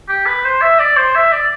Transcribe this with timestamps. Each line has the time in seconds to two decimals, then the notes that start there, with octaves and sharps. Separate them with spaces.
0.09 G4
0.26 B4
0.45 C5
0.61 E5
0.80 D5
0.97 C5
1.15 E5
1.33 D5